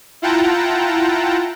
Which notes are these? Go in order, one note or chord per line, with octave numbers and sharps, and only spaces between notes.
E4 F4 F#5 G5 A5 A#5